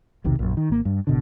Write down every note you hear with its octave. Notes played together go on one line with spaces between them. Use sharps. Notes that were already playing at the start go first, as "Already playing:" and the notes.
E1 B1 C3 D#3
A#1 F#2
D#3
G#1 A#3
G2
G#1 B2 D3